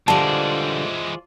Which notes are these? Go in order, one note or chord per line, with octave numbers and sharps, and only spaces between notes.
D3 E3 G3 G#3 F4 C5 D5 A5